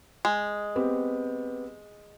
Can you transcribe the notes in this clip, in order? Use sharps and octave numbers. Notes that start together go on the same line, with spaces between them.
G#3
B3 C4 G4